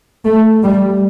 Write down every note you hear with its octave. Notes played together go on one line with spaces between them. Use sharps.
A3
G3